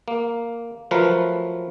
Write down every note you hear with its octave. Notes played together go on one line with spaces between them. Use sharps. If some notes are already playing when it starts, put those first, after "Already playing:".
A#3
F3 F#3 A3 A#4 B4